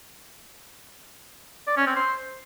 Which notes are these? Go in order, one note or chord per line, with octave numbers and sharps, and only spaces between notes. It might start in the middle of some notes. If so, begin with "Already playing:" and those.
D5
C#4
C4
C5